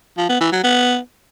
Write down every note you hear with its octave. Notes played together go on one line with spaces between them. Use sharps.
F3
B3
E3
F#3
B3